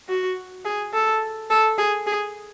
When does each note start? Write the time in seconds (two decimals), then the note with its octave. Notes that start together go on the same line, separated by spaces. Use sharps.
0.09 F#4
0.65 G#4
0.93 A4
1.50 A4
1.78 G#4
2.06 G#4